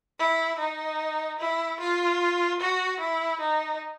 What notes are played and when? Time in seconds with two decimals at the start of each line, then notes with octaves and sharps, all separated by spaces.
0.19 E4
0.59 D#4
1.40 E4
1.80 F4
2.60 F#4
3.00 E4
3.41 D#4